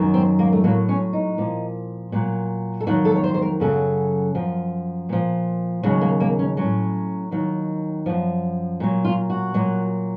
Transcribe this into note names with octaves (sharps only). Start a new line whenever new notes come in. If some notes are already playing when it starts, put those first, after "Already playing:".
Already playing: F#2 D#3 F#3
C4
A#3
A3
A2 F#3 A#3
C#4
D#4
A#2 F3
A#2 F#3
A4
F2 D#3 F#3 F#4
A4
C#5
C5
C5
A#4
F#2 C#3 F#3 A4
F#2 F3
A#2 F3
D#2 C#3 F#3 F#4
A#3
A#3
C#4
A2 F#3 C#4
D#2 D#3 F#3
F#2 F3
A#2 F#3
F4
F#4
A#2 F#3